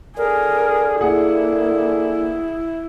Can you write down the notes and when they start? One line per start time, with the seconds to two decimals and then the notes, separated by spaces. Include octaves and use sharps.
0.17 D3 G#4 A#4
1.01 A#3 E4 G#4 F#5